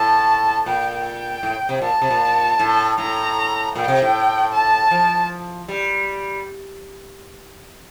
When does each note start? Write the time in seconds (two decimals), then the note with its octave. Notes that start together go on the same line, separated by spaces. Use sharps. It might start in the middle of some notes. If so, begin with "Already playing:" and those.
Already playing: A2 A5
0.66 A#2 G5
1.04 G5
1.43 A2
1.69 C3
1.82 A#2 A5
2.02 C3
2.11 A#2
2.59 A2
2.98 A2 A#5
3.75 A#2 G5
3.88 C3
4.02 A2
4.53 A5
4.91 F3
5.68 G3